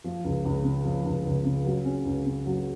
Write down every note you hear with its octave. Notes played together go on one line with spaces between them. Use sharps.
F3
C#2
C#2
C#3
F3
C#2
C#2
C#3
F#3
C#4
C#2
C#3
F#3